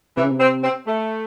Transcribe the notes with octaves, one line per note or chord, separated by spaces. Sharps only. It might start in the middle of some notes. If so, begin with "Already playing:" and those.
C3 E3
C#3
C3
C4
C4
A3